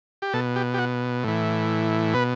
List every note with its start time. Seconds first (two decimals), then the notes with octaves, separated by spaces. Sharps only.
0.22 G4
0.33 B2 A4
0.56 G4
0.74 G4
0.78 F#4
1.24 A2 E3
2.13 B2 B4